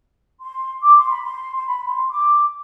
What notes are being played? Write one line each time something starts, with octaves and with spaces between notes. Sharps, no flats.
C6
D6
C6
B5
C6
C6
B5
C6
D6